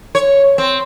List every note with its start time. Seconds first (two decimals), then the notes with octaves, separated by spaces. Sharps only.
0.15 C#5
0.58 C4